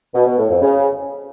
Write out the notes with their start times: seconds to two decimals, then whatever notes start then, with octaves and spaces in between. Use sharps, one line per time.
0.15 B2
0.26 B2
0.38 A2
0.50 F2
0.62 C#3